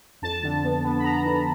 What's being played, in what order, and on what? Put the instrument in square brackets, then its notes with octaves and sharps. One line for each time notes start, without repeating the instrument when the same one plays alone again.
[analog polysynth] F2 A5
D3
B3
B3
B5
B3 A#5
D3